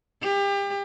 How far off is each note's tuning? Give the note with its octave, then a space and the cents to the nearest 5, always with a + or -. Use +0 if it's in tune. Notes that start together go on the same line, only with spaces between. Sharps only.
G4 +30